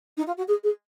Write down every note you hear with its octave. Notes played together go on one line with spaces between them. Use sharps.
D#4
F4
F#4
G#4
G#4